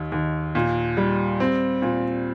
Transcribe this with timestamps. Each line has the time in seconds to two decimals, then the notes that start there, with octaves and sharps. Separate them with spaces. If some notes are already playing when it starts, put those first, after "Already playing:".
Already playing: D#2 D#3
0.12 D#2
0.55 A#2
0.97 G3
1.40 C4
1.82 A#2